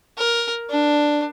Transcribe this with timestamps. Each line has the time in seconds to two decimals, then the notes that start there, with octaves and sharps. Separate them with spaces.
0.18 A#4
0.70 D4